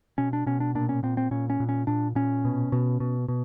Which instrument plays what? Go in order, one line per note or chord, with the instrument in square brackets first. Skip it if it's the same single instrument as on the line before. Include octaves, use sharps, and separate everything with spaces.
[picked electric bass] B2 C#4
D4
B2 C#4
D4
A#2 D4
C#4
A#2 C4
C4
A#2 C#4
C#4
A#2
C#4
A#2 D4
A#2 C#4
B2
B2
B2
B2